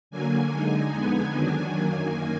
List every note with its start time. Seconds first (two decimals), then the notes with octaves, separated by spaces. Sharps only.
0.11 D3 F#3 A#3 G#5
0.52 D3 G#3 D#4
0.93 F2 D3 G#3 B3 D#4
1.35 D#3 F#3 D4 G#5
1.76 F#2 D#3 A#3